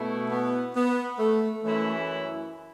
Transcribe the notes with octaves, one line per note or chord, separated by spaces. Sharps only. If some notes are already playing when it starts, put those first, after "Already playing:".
Already playing: B2 A3 E4
B3
B3
A3
F#2 E3 A3 C#4 E4